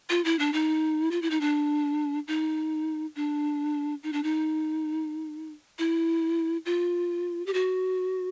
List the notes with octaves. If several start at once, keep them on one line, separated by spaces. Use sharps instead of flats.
F4
E4
D4
D#4
F4
E4
D#4
D4
D#4
D4
D#4
D4
D#4
E4
F4
G4
F#4